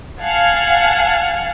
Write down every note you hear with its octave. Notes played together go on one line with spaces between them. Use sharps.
F5 F#5 G#5 A5 F6 G#6